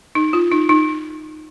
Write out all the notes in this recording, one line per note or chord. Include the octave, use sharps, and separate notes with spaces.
D#4
F4
D#4
D#4